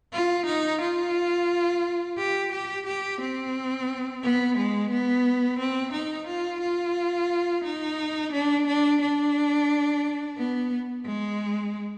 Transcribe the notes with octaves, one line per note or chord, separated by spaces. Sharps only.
F4
D#4
F4
G4
G4
G4
C4
B3
G#3
B3
C4
D#4
F4
F4
D#4
D4
D4
D4
B3
G#3